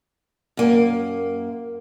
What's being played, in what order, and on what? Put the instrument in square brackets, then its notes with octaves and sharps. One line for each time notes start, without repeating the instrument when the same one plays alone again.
[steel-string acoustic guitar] F#2 A#3